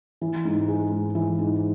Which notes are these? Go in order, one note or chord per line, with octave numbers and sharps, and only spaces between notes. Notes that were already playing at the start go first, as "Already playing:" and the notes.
E3
G#2
G#3
G#2
E3
G#2